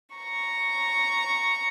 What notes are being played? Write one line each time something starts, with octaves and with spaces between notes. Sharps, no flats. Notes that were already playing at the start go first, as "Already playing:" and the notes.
A#5 C#6